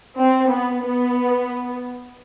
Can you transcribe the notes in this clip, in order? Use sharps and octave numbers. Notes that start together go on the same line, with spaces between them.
C4
B3
B3